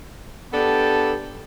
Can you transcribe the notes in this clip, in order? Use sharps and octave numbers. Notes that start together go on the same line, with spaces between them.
B3 D4 G4 A4